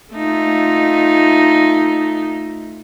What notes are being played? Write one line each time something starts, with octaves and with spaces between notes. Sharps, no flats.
A3 D#4 F4